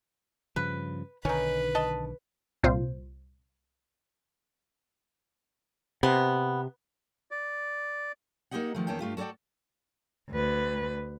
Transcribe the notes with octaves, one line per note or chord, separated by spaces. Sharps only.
G2 C#3 F3 B4
B1 D3 D#3 C#4 D#4 B4
D#5 A5
C2 A#2 F4 C5
C3 B3
D5
A#3 D#4 F#4 G4 D#5 F#5
D#3 F3 A3
E2 D#3 A#3 C#4 A4 G5
G2 A3 F4 G4
F#4 A4 C#5 D5 G5
D2 B4